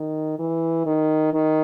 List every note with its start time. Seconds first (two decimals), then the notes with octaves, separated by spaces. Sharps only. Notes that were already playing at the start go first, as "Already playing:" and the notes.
Already playing: D#3
0.39 E3
0.86 D#3
1.33 D#3